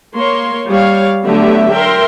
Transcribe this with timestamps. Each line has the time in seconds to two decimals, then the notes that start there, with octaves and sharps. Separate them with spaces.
0.15 A#3 C#5 C6
0.70 G3 C#5 F5
1.24 D3 F#3 A3 B3 G4 E5
1.74 A#4 E5 G5 C6